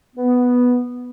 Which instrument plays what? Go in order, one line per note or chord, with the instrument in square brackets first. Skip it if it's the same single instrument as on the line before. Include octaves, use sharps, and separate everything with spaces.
[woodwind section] B3